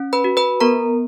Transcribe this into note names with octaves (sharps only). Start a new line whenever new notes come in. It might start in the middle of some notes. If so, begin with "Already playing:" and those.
Already playing: C#4
B4 B5
F#4
B4 B5
B3 A#4 A#5